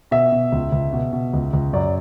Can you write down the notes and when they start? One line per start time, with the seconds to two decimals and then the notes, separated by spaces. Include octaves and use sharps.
0.11 B2 E5
0.32 B2
0.52 C#2
0.72 C#2
0.93 B2
1.13 B2
1.33 C#2
1.53 C#2
1.73 F#2 D5